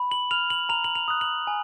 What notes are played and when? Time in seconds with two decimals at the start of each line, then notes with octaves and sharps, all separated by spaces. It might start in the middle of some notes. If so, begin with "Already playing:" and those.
Already playing: B5
0.11 F#7
0.31 F6 F7
0.50 F#7
0.69 A#5 F7
0.84 F#7
0.95 F7
1.08 D#6 F#6
1.21 F#7
1.47 G#5